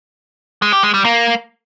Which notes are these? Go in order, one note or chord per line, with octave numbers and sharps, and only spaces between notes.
G#3
G4
G#3
G3
A#3